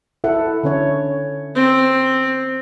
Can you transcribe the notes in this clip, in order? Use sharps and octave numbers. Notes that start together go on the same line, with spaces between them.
E4 A4 F#5
D3 C#4 C#5
C4